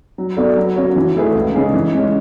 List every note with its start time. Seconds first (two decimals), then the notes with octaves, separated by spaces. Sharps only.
0.18 F#3
0.37 B3 F#4 A4 D5
0.57 F#3
0.76 C#4 F#4 C#5
0.96 E3
1.16 A3 E4 G#4 B4
1.35 C#2
1.55 C#3 G#3 C#4 G#4
1.74 E3
1.95 G#3 C#4